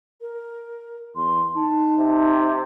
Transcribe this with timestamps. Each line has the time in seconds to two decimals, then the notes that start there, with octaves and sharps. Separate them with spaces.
0.21 A#4
1.16 E2 C6
1.56 D#4 A5
1.99 C3